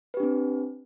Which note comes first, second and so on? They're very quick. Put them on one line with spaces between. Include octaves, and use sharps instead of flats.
B4 G4 D4 C4